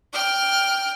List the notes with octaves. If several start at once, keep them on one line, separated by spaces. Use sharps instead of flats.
G5 F6